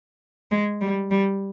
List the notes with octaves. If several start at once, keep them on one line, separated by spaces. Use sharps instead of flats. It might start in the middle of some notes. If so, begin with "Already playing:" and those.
G#3
G3
G3